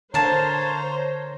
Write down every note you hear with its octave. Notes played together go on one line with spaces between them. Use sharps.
D3 A#4 C5 C#5 F5 A5 A#5